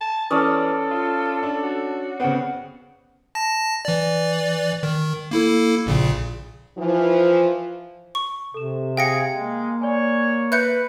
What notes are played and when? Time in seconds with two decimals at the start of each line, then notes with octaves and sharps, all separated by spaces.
0.01 A5
0.31 E3 C#4 A4 D5 D#6 F6
0.91 F4
1.43 D4
1.63 F#4
2.20 C#3 B3 C4 F#5
3.35 A5 A#6
3.85 E3 D5
4.83 D#3
5.31 A#3 E4 A4
5.86 A#1 A#2 C#3
6.77 E3 F3
8.15 C#6
8.54 C3 A4 E7
8.97 G#4 F5 G5 A#6 C#7
9.34 G#3 A#3
9.82 C#5 D5 G#5
10.52 B4 E5 F#6 G6 C#7